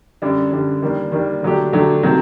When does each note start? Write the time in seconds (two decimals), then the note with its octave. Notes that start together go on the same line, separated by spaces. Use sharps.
0.22 F#2 D3 G3 D4
0.52 F#2 D3 G3 D4
0.82 D#3 G3 A#3 D4
1.12 D#3 G3 A#3 D4
1.42 D3 F#3 A3 D4 G4
1.73 D3 F#3 A3 D4 G4
2.03 C3 D#3 F#3 A3 C4